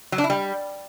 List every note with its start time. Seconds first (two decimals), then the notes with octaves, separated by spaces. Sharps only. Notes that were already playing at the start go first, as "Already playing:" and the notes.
0.12 F#3
0.18 D4
0.24 E4
0.30 G3